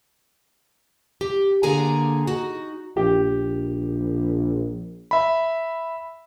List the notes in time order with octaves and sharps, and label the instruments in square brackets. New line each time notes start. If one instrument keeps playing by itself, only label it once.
[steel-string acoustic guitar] G4
D3 A#3 G#4 G#5 A#5
D#4 F#4
[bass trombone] A#1 [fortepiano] G4
[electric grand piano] E5 B5